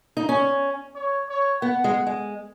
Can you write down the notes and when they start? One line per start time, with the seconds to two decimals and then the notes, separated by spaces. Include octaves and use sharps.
0.17 D#4
0.29 C#4
0.95 C#5
1.29 C#5
1.62 B3 F#5
1.84 G#3
2.07 G#3